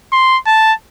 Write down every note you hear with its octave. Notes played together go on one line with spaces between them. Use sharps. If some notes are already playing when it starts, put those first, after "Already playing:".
C6
A5